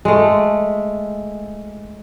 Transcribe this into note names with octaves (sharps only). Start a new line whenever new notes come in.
G#3 A3